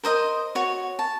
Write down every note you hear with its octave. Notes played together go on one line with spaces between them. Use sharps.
A#4 C5 D#5 D#6
F#4 C#5
A5